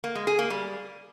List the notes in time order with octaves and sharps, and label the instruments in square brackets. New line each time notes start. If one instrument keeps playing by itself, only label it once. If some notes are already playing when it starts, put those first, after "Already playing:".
[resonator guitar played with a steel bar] A#3
G#3
G#4
A#3
G3